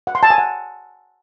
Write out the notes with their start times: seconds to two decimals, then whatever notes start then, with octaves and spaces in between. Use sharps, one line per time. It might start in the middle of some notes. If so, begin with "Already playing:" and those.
0.07 F#5
0.15 C6
0.23 A5
0.30 G#5
0.38 F#5